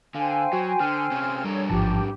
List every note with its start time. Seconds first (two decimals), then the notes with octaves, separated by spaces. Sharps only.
0.15 D3 C5 F5 G5 G#5
0.53 F#3 F#4
0.80 D3 F6
1.11 C3 C#4
1.45 G2 G3 D4 A4 A#4 C#5
1.70 A1 G#2 F3 G4 A5